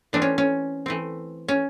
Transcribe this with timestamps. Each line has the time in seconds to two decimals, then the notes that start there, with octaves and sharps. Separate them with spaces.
0.13 E3 A3 C4 D4
0.22 C#4
0.38 C#4
0.86 E3 A3 C4
1.48 C#4